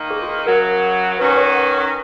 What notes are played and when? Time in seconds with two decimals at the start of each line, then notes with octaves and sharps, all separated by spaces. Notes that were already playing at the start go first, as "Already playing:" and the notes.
Already playing: D#3 A#3 D#4
0.11 G#4
0.22 F#4
0.28 G#4
0.39 G#4
0.46 F#2 C#3 F#3 A#4
1.18 D#3 F#3 C#4 F#4 B4
1.32 B4
1.37 C#5
1.55 F#5